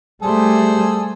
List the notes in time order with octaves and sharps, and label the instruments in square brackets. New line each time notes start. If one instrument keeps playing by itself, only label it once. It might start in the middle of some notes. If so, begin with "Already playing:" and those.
[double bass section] G3 A3 [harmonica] G#4 A4 C5